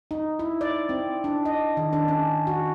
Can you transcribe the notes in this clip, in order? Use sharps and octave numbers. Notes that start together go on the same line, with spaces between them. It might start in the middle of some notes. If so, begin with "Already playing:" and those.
D#4
E4
D5
C4
D4
D#5
D#3
D4
C#4
F#4